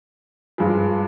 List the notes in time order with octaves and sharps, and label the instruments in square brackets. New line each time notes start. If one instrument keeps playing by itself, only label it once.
[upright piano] G2 F3 G#3